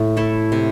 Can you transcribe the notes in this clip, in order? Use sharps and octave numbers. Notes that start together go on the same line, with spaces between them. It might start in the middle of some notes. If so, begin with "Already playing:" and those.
Already playing: A2
A3 E4 A4
C3